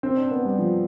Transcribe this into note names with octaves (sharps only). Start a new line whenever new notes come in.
C4
D4
B3
G3
F3